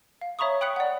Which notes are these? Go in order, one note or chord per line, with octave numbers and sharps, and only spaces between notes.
F5
C#5 E5 A#5 B5 C#6 D#6
G5 B5 D#6 F#6 B6 C#7
D5 F#5